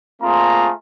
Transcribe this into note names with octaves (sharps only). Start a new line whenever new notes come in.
A3 A#3 C4 F4 G#4 A#5